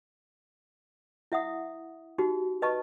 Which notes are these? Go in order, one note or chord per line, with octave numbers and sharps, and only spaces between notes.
E4 E5 F#5 D#6
D#4 F#4 G4
B4 D#5 A5 C#6